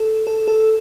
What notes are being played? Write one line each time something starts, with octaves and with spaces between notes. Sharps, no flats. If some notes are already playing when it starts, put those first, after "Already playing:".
Already playing: A4
A4
A4